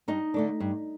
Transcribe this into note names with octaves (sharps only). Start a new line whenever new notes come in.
G2 D#4 D#5
D3 A3 D4
G2